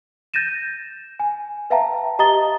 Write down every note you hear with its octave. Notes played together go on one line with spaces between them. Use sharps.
G6 A6 A#6 D#7 E7
G#5
B4 E5 F5 G5 A5 A#5
G4 D#5 A#5 D#6 A6 G7